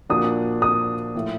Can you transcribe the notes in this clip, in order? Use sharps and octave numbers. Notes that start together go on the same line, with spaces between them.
A#2 F3 A#3 D4 F#4 D#6
D#6
A2 F3 A3